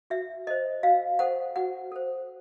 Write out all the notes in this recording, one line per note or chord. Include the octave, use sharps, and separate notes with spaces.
F#4 E5
A4 C5 D#5
F#4 F5
A4 C5 F#5
F#4 F#5
A4 C5